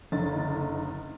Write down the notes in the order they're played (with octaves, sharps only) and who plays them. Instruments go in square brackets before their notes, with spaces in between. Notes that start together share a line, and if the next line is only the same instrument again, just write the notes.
[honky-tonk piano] F#1 D3 D#4 A6